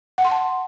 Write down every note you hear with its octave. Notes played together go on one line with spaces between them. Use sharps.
F#5
C6
A5